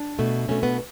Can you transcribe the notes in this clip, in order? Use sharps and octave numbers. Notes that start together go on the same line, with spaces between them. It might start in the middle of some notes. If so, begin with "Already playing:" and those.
Already playing: D4
B2 A3
B2 A3 C#4
B3